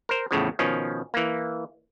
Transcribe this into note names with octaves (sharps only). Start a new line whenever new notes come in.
A#4 C5
E2 A2 C#3 F3
B2 D#3 F3 C#4
E3 A#3